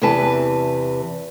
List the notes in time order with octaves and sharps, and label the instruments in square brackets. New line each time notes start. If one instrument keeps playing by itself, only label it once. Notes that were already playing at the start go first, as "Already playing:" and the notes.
[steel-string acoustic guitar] E2 C3 E3 B4 A5